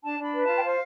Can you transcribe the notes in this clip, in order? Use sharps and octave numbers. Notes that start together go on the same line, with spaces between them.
D4 A5
D4 B5
B4
F4 A5
G5
C5 F5